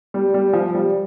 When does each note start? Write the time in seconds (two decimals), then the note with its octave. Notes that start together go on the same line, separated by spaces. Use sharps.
0.14 G3
0.34 G3
0.53 F3
0.74 G3